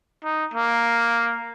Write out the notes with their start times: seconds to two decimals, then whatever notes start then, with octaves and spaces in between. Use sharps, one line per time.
0.24 D#4
0.54 A#3